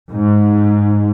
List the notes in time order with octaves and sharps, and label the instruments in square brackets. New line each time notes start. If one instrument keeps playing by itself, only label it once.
[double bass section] G#2